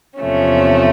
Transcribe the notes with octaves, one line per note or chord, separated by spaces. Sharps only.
E2 C3 F3 A3 C#4